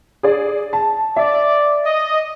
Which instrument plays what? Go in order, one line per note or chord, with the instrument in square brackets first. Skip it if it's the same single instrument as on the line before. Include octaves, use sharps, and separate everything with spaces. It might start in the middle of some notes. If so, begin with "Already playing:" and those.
[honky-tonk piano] G#4 D5
A5
[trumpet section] D5 [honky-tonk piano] E5
[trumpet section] D#5